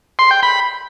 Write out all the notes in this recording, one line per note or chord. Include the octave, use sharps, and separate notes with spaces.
C6
G5
B5